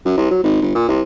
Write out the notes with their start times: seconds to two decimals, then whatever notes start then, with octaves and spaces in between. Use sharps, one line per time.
0.05 F#2
0.17 C2
0.31 F#3
0.44 G#1
0.62 G1
0.75 A#2
0.88 C2